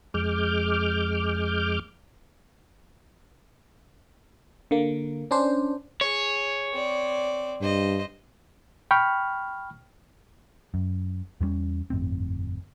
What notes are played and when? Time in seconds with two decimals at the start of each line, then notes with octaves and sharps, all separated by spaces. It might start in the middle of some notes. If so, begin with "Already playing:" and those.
0.14 F2 G#3 D6 F6 G6
4.71 D3 A#3
5.31 C#4 D4 C5
6.01 G#4 C#5
6.73 C4 D5
7.62 G2 C5 D#5
8.91 G5 B5 C#6 F6
10.74 F#2
11.41 E2 G2 G3 C#4
11.90 G1 F2 A2 C4